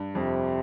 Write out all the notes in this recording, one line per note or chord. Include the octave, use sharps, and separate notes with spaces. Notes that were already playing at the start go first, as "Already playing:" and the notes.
Already playing: G2
F2 C3